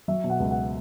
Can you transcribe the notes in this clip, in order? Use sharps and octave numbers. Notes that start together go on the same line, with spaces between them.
F#3 E5
B2
F#5
C#2
F#5